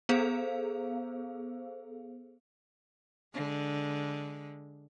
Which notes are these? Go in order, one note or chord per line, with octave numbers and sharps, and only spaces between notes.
B3 G#4 A4 C5 F5
D3 G#3